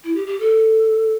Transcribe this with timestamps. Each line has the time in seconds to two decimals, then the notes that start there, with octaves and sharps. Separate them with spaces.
0.04 E4
0.15 G4
0.27 G4
0.40 A4